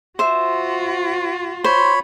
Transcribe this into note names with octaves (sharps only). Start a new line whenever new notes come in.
F4 F#4 C5 E5
C5 C#5 B5